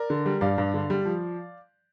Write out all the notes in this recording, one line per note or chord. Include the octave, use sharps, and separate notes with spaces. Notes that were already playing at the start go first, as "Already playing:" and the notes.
Already playing: A#4 D5
D3
G3
G2 D5 F5
G2
D3
G3
F3